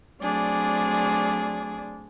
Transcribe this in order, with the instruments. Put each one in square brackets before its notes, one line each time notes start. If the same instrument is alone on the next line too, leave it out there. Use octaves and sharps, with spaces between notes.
[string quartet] F#3 A3 C4 D4 G#4 D5